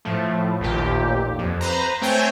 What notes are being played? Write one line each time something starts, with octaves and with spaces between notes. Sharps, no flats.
A2 F3 A3
A1 D#2 A#2 G4
F2
B4 C5 A#5
A3 C4 C#5 G5 G#5